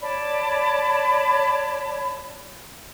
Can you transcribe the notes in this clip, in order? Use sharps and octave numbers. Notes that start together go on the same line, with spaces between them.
C#5 D5 A5 B5